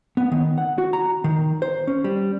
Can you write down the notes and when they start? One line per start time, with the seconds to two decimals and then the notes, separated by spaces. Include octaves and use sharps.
0.17 B3
0.32 D#3
0.58 F#5
0.78 F#4
0.93 A#5
1.24 D#3
1.62 C5
1.87 C#4
2.04 G3